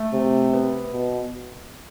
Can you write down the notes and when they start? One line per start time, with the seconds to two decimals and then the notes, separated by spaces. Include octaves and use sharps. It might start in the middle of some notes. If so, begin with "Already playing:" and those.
Already playing: A3
0.13 C3
0.53 B3
0.92 B2